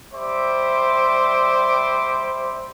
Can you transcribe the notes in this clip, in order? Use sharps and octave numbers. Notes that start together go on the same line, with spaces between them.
G3 C5 E5 D6